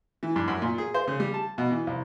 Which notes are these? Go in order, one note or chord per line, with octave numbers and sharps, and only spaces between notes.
E3
G2
F#2
A#2
G#4
C5
C#3
G3
A5
B2
E3
C2